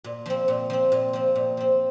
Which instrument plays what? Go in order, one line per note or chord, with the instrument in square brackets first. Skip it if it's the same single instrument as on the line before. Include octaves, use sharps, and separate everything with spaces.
[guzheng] A#2
F3 C4
A#2
F3 C4
A#2
F3 C4
A#2
F3 C4